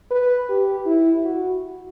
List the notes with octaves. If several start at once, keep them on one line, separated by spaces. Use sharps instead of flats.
B4
G4
E4
F#4